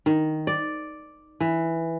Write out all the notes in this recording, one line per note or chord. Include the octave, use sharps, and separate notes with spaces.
D#3
D5
E3